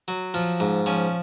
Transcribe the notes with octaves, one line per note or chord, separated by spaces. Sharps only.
F#3
F3 F4
G#2
F3 C#4